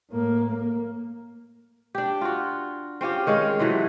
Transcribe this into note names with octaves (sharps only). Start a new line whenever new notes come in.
A2 A#3
A#3
D4 G4
F4 F#4
C4 C#4 F4 G4
D#3 G#3 C#5 F5
C3 E3 F#3 A3